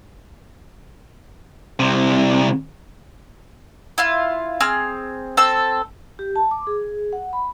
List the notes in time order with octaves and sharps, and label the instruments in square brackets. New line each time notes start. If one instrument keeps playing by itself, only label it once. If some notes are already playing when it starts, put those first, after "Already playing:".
[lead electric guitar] C2 C3
[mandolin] E4 F4 F5
C4 G#4 F6
C4 A4 E6
[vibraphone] G4
A5
D6
G#4
F#5
B5